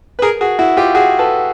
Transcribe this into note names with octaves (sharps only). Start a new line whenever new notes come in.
B4
G#4 A#4
F#4 G#4
E4 F#4
F4 G4
F#4 G#4
A4 B4